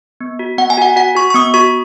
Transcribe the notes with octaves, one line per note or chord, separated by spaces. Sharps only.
B3
F#4
B3 F#5
G#5
F#4 F#5
F#4 F#5
F#4 C#6
C#6
B3 D#6
F#4 C#6